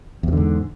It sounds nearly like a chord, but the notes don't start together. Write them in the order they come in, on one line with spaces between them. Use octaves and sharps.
E2 B2 D3 G#2